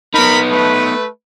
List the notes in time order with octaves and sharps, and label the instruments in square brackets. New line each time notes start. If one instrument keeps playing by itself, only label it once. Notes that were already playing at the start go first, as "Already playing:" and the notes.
[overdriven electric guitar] B3 D#4 [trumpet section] A#4 B5
[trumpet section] A3 B4